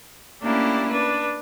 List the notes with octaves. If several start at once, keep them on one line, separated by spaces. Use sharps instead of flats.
A3 A#3 C#4 D4 E4 G4
D4 B4